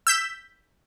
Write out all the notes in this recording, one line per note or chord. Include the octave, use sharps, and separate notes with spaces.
E6 G6 B6 E7